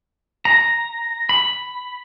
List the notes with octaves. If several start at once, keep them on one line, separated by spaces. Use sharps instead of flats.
A#5
B5